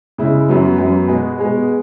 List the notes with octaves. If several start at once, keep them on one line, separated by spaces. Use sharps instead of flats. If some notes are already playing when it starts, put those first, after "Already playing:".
C#3 G#3 E4
F#2 F#3 B3
F#2 F#3 B3
B2 G#3 B3 G#4
B2 G#3 B3 G#4